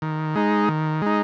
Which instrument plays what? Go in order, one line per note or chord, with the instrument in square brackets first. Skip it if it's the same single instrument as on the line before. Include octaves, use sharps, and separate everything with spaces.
[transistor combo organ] D#3
G#3 D#4
D#3
G#3 D#4